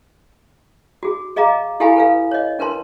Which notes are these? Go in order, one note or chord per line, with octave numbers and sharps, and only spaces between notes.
F#4 G#4
G#4 D#5 F5 A#5 D6
E4 G4 A4 F5 G#5 B5
A4 B4 F5
C#5 D#5
D4 A#4 B4 A5 C6